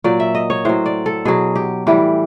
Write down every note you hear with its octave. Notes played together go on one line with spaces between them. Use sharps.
A#2 F#3 D5
E5
D#5
C#5
A2 F#3 C5
D5
A4
B2 F#3 G#4
G4
A2 E3 G3 G4